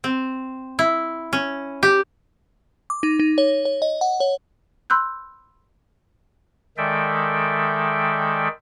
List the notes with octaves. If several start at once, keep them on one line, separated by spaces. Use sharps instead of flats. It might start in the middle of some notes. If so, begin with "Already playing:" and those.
C4
E4
C#4
G4
D6
D#4
D#4
C#5
C#5
D#5
F#5
C#5
B5 C6 E6 F#6 G6
D#3 G#3 A4 D5 E5 G5